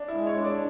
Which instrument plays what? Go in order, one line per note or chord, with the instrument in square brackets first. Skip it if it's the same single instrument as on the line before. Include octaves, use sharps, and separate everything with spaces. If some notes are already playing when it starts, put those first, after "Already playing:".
Already playing: [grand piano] D4
E4
[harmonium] G#3
[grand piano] C#5
[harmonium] D4
[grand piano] D5